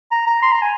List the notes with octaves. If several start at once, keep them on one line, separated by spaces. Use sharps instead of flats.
A#5
A#5
C6
A#5
G#5